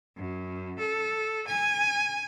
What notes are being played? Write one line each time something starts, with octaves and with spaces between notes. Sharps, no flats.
F#2
A4
G#5